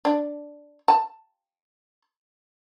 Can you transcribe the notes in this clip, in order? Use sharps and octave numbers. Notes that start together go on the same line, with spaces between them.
D4
A5